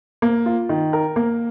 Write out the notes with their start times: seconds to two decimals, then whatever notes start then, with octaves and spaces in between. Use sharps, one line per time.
0.22 A#3
0.46 F4
0.69 D#3
0.93 A#4
1.16 A#3